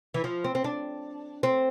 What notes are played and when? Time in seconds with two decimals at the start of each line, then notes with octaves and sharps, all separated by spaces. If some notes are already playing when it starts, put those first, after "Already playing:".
0.14 E3
0.24 F3
0.44 C4
0.55 C4
0.64 D4
1.43 C4